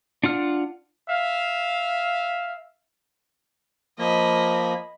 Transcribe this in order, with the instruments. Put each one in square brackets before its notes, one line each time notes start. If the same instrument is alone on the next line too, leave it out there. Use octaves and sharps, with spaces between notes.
[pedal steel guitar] D4 F4 F#5 F6
[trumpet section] E5 F5
[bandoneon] F3 A#3 [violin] D#5 B5